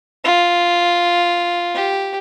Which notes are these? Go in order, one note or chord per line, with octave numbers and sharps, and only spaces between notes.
F4
G4